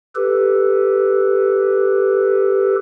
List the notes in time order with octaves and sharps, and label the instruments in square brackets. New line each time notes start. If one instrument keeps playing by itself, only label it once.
[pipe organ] G4 A4 B4